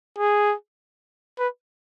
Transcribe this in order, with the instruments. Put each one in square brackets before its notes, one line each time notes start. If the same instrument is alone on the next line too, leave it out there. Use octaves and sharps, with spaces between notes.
[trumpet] G#4
B4